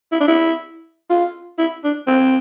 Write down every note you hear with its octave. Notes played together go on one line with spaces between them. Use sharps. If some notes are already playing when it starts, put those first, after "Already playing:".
E4
D4
E4
F4
E4
D4
C4